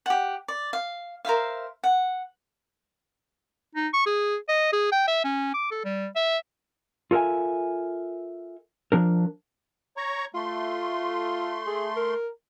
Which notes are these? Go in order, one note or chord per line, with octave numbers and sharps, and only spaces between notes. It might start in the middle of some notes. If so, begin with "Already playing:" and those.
G4 F#5
D5
F5
A#4 C5 E5 F5
F#5
D#4
C#6
G#4
D#5
G#4
G5
E5
C#4
D6
A4
G3
E5
F4 A4 A#4 E5 G#5
F3 D4 A#4
C#5 A#5 C#6
A3 F4 C6
G#4
A#4